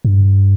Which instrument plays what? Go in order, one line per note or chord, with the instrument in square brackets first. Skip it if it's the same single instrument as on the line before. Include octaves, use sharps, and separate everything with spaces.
[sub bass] G2